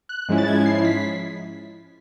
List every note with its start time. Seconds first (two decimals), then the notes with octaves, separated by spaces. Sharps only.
0.09 F#6
0.29 G#2 F3 G#3 C#4 E4
0.38 A6
0.48 G#6
0.66 C7
0.85 B6